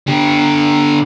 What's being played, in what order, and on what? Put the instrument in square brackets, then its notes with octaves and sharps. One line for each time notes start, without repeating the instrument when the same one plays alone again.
[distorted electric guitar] D3 G4